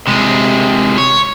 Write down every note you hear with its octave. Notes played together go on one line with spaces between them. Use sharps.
C3 G#3
C#5